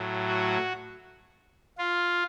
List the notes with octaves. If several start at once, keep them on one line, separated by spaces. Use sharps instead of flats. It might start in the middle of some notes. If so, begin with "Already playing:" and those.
Already playing: A2 F#3
F#4
F4